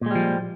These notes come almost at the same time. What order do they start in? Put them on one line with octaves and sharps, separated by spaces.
A#2 G#3 G3 F3